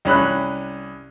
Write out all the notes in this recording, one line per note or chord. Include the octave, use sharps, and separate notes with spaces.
C2 C#4 B5 F#6